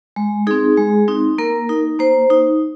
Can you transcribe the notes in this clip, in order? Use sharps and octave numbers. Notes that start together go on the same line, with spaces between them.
G#3
C4 D#4 G#4
G#3
C4 D#4
A#3 A#4
D#4
A#3 C5
D#4